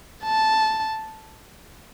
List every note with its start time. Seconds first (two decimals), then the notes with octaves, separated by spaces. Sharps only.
0.25 A5